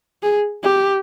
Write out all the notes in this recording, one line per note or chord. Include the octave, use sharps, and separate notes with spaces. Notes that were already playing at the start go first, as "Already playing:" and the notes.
G#4
G4